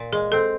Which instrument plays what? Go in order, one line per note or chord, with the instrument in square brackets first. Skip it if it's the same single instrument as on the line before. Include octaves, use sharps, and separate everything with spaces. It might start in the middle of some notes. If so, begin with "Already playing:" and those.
Already playing: [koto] A#2
[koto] G#3 [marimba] G#4
[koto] C4 [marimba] A4